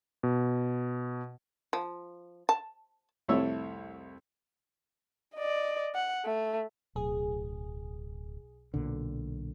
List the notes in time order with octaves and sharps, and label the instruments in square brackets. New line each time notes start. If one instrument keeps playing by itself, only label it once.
[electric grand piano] B2
[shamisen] F3
A5
[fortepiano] C2 F2 A3 E4 C#5 E6
[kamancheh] D5 D#5
F#5
A3
[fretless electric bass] D1 [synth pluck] B1 G#4
[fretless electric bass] B1 A#2 D3